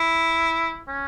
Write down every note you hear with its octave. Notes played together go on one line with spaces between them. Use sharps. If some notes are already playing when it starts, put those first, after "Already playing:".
Already playing: E4
C#4